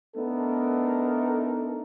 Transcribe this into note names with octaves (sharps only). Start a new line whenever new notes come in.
A3 B3 D4 D#4 A4 A#4